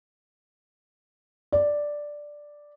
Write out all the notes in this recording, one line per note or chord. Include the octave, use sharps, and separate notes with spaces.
D5